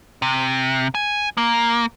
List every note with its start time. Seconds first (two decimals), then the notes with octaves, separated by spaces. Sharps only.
0.22 C3
0.95 G#5
1.37 A#3